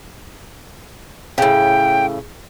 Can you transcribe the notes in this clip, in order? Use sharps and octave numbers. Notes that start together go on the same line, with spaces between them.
A2 C#3 G5